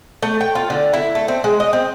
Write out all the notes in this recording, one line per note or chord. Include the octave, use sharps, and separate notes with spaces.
A3
G5
F4
D3
E4
A3
C4
G#3
D#5
C4